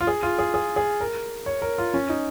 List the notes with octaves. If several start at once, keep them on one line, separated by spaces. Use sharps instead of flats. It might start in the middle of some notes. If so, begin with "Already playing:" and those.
F4
G#4
F4
G#4
G#4
G#4
A#4
C#5
A#4
F4
C#4
D#4